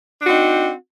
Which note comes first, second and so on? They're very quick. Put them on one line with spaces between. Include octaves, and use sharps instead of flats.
D4 F#4 C4 D#4